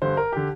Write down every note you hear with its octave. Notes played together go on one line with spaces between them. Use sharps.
G2 D3 C5
A#4
D3 G4